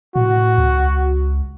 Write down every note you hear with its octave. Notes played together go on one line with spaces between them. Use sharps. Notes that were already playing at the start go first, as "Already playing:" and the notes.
A2 F#4
C#2